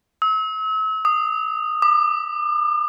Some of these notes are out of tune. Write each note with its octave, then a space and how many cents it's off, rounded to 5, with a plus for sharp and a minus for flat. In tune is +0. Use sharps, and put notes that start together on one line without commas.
E6 -40
D#6 -15
D6 +40